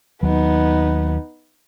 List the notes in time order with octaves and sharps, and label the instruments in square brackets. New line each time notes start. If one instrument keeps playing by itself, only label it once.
[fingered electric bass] D#2 F#3 [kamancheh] B3 D#4